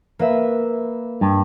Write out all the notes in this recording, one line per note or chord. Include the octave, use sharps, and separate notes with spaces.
A#3 B4 E5
G2